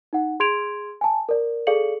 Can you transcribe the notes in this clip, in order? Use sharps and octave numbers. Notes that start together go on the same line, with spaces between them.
D#4 F#5
G#4 C6 G#6 D7 F7
G#5 A5
A#4 D5
G#4 A4 D5 F5 C#7 F#7